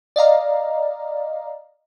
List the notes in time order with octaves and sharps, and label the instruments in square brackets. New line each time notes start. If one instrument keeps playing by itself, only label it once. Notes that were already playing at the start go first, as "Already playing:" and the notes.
[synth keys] D5 D#5 F5 A#5